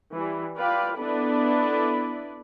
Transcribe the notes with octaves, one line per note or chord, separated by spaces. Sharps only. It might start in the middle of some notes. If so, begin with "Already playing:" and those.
E3 G3
F4 B4 D5 F5 G5
B3 D4 E4 A4 B4 D5